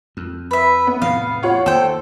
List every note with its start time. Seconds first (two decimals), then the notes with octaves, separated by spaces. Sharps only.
0.17 F2
0.51 B4 E5
0.87 B3
1.02 E2 A2 C3 F5
1.43 F4 C#5 F#5
1.66 D#2 A4 C5 G5